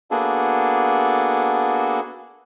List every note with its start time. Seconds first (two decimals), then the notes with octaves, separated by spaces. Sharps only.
0.11 A#3 B3 D4 F#4 G#4 A4